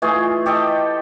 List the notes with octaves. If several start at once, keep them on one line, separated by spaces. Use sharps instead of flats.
E3 A3 F4 G#4
G4 A4 D#5 G5